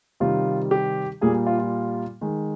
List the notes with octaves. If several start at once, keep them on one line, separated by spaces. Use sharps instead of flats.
C3 D#3 G3 F4
G4
A#2 G3 A#3 G#4
F4
F4
D#3 G#3